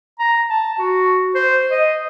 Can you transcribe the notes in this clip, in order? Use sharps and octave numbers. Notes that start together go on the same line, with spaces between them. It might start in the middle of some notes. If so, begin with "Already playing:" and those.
A#5
A5
F#4
C5
D#5